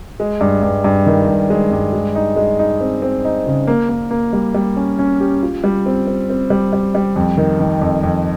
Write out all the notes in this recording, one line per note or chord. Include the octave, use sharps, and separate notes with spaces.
G#3
G2
G2
G2
D#3
G2
G#3
G2
G#3
D#4
G#3
D#4
C4
C4
D#4
C#3
A#3
A#3
A#3
G3
G3
C#4
C#4
G4
F4
G3
C4
C4
C4
G3
G3
G3
F2
D#3
D#3
F2
F2